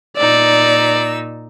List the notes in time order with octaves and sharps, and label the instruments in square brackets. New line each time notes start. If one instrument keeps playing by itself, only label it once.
[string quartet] A#2 D#4 E6 [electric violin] D5